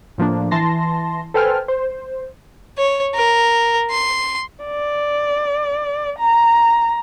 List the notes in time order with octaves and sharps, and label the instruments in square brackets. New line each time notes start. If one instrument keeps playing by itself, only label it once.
[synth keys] A2 F3 A#3 D4
E3 A5 C6 A#6
A4 B4 C5 G5 G#5 F6
C5
[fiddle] C#5
A#4
C6
[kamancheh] D5
A#5